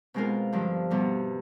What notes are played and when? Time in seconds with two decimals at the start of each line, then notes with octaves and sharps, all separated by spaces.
0.14 B2 G#3 C4 F4 A#4
0.53 G2 D3 F3
0.90 E2 B2 G3